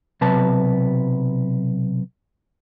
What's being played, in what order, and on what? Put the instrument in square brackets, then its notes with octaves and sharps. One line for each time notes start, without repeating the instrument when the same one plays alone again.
[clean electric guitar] B1 C3 F#3 B4 A5